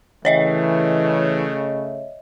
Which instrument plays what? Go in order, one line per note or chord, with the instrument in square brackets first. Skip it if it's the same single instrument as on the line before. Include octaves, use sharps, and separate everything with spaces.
[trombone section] C#3 A3 [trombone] E3 [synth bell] C#5 D#5 E5